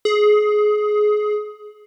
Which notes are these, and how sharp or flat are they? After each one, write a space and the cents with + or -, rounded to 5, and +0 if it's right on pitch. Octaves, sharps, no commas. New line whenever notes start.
G#4 +20